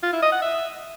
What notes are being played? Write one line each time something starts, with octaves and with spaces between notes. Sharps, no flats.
F4
E4
D#5
F#5
E5